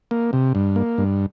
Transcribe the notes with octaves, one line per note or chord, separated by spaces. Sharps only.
A#3
C3
G2
A#3
G2